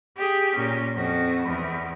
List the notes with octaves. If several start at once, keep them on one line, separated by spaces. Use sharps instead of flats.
G4 G#4
A#2 C#4
F2 F#4
E2